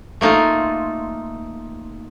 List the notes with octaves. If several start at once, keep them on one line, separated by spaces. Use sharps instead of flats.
A3 A#3 D#4 F4